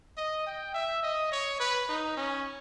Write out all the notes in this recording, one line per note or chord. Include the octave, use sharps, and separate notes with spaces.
D#5
G5
E5
D#5
C#5
B4
D#4
C#4